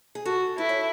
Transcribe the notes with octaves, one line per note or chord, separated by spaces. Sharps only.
G#4
F#4 A4
E4 B4
C#5